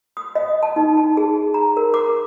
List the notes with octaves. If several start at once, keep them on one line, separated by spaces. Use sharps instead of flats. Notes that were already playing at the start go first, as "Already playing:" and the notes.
D#6
D#5
A5
D#4
A5
G#4
A#5
A#4
D6